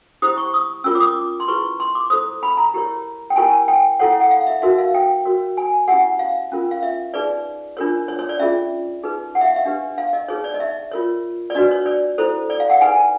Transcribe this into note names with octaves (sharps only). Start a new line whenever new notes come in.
E4 G4 C5 D#6
C#6
D#6
C#4 F4 A#4 C#5 E6
D6
D#6
D6
C6
E4 G#4 B4 C#6
C6
D6
E4 A4 C5 D#6
B5
A#5
E4 G4 A#4 C#5
G5
E4 G4 A#4 C#5 G#5
G5
E4 A4 C#5 F#5
F#5
F5
E5
D#4 F#4 A#4 E5
F5
G5
F#4 A#4 C#5
G#5
C#4 E4 G4 F#5
F5
C#4 F4 A#4
F5
E5
D#4 G#4 B4 D5
D4 F4 A#4 C#5
C#5
C#5
D5
C#4 F4 G#4 E5
D#4 G#4 B4
F#5
E5
F5
E5
D4 G4 B4
F5
D#5
D#4 G#4 B4 C#5
D5
D#5
E5
F4 A#4 C#5
D5
D4 F#4 B4 D#5
C#5
D5
E4 A4 C5
D5
F5
F#5
D#4 G#4 B4 G#5